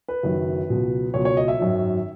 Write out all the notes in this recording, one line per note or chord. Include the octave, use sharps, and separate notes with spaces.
B4
F#1 F#2 D#3 F#3
C#2 B2 F#3
C#2 B2 F#3 C#5
C#5
D#5
E5
G#1 F#2 D#3 F#3